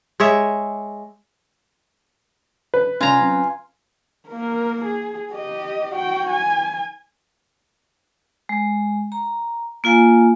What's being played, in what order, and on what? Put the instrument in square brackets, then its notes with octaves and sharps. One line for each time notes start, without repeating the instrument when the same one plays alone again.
[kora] G#3 C#5 E5
[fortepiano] B4
[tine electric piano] C3 G3 C#4 [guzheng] F4 A#5 [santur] G#5
[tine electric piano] F#3 C4 C#4
[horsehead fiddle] A#3 A#4
G#4
G4 D#5
F#4 G5
G#5
[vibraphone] G#3
A#5
A#3 F4 F5 G#5